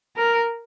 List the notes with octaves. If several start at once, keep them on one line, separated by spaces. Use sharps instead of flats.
A#4